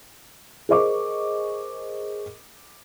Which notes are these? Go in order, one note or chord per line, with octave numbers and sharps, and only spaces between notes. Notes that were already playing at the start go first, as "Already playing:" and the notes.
G#4 A#4 C5 D#5 C#6 D6